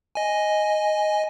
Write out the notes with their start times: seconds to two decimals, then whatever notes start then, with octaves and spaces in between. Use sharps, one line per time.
0.15 D#5 G#5